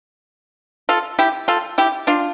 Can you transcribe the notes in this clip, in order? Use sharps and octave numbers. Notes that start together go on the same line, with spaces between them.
F4 A4
E4 G4
F4 A4
E4 G4
D4 F4